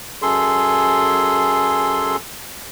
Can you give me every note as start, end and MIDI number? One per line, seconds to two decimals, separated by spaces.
0.22 2.16 42
0.22 2.16 68
0.22 2.16 69
0.22 2.16 84